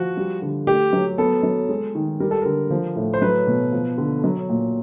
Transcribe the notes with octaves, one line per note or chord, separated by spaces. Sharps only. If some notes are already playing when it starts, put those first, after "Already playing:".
Already playing: F3 F#4
G3
D3
A3 G4
F#3
B3 A4
F#3
G#3
D#3
G3 A#4
A4
D3 A#4
F3
A2
C5
F#3 B4
B2
F3
D3
F#3
A#2